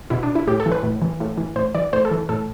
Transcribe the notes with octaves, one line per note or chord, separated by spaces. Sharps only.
B2 E4
D4
E4
A2 G4
A4
E3
B4
A2
E3
A2
E3
A2 C5
E3 D5
A2 C5
A4
E3
A2 A4